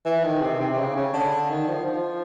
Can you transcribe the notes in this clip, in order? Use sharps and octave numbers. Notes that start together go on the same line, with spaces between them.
E3
D#3
C3
C3
C3
C#3
C#3
D3
D#3
F3
F3